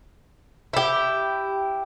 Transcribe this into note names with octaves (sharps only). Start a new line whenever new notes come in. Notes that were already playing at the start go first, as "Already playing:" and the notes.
E4 G4